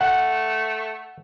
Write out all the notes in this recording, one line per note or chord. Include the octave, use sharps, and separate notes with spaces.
A3 F#5